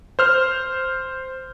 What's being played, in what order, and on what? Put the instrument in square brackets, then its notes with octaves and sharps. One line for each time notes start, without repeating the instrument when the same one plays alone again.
[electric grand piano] C5 F6